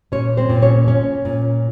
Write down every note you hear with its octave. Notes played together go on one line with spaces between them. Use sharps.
A#2 C#4 C#5
C4 C5
A#2
C#4 C#5
C#4
A#2